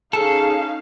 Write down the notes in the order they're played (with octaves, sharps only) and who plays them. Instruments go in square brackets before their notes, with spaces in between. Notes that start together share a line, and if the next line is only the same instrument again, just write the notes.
[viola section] C#4 D#4 F5 [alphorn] G#4 [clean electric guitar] A4